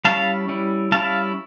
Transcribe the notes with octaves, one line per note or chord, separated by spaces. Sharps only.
G3 C#4 E4 F5 A5
G3 C#4 E4
G3 C#4 E4 F5 A5